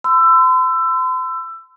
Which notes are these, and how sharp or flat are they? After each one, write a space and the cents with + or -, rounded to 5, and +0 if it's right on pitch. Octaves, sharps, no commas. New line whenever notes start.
C6 -40 E6 +20